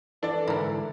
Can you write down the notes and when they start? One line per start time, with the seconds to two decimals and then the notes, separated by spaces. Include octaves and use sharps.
0.23 E3 D4 A4 D5
0.48 G#2 D3 E4 A#4